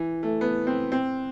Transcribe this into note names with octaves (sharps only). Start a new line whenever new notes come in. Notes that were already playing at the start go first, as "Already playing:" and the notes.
Already playing: E3
A3
B3
C4
C4